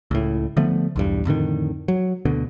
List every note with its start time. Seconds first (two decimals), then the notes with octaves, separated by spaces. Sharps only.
0.11 C#2 A2
0.57 D3 F3 A3 B3
0.96 B1 E2 G2
1.25 F2 A2 D3 D#3
1.88 F#3
2.25 D2 B2 D3